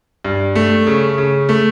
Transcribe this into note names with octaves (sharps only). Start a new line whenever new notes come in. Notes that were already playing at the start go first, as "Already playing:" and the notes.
G2
A3
C#3
C#3
A3